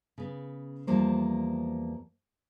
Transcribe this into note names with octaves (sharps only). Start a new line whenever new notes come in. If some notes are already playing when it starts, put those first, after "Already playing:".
C#3 B3
E2 F3 G3 A#3 C5